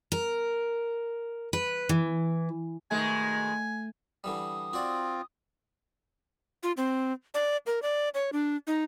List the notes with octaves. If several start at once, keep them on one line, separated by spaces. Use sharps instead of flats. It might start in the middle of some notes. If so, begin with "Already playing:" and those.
A#4
B4
E3
B2 D#3 G#3 A3 G#5
D3 E3 G3 D#6
C4 F4 F#4 D5
F4
C4
D5
A#4
D5
C#5
D4
D#4